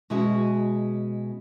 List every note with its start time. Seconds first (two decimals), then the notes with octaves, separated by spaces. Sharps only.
0.10 B2 G#3 C#4 E4 F#4 G#4